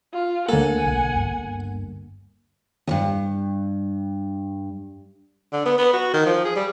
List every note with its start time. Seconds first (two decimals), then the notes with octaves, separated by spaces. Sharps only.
0.13 F4
0.49 D2 A#3 A4 F#5 G#5
0.85 B1
1.16 G1 G2
2.87 E2 G2
5.53 D3
5.66 B3
5.78 B3
5.93 F#4
6.14 D#3
6.26 F3
6.45 G#4
6.56 G3